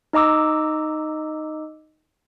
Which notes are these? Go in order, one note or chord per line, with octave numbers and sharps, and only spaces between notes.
D#4 D#5 A#5 D6 E6